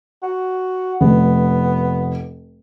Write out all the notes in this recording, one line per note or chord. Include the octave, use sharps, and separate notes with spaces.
F#4
F1 B3